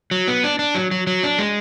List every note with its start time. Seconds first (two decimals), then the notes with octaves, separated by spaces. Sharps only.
0.11 F#3
0.28 B3
0.44 D4
0.59 D4
0.75 F#3
0.91 F#3
1.07 F#3
1.23 D4
1.38 G#3